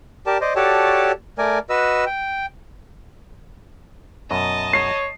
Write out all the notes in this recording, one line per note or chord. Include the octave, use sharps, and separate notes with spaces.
G4 A#4 D5 A5
C5 D5 D#5
F#4 G4 A4 C#5 D5 A5
A3 A#4 D5 G#5
F#4 B4 D#5 E6
G5
F#2 B2 D#5 A5
C#5 C7